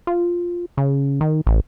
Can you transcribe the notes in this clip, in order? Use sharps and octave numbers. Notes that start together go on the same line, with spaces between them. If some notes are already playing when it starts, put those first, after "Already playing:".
F4
C#3
D#3
A1